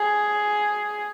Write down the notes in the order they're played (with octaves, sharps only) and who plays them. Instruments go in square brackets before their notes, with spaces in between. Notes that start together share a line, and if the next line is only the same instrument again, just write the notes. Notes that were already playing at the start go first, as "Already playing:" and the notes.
Already playing: [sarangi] G#4